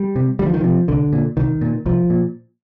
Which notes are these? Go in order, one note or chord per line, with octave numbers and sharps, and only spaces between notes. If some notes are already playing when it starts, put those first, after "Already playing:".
Already playing: G3
C3
D2 G3
F3
D#3
C3 F3
C2 D3
A#2
C2 D#3
A#2
C2 F3
A#2